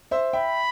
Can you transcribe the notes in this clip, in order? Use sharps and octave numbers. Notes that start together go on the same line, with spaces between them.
C5 E5
E5 G5 B5